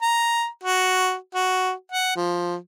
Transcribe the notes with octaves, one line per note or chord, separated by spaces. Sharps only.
A#5
F#4
F#4
F#5
F3